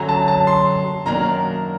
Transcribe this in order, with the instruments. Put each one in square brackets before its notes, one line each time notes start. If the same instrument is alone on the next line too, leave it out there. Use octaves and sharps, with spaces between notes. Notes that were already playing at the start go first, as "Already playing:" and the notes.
Already playing: [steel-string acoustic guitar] F#2 D3 F#3 [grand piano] A#5
[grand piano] A5
A5
C6
[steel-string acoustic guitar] F#2 D#3 F#3 A#3 D4 [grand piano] A#5